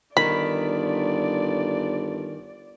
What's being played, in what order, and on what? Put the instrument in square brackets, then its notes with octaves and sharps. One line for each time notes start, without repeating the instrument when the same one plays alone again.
[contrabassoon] G1 [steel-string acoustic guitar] D#3 [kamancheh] D5 [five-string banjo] B5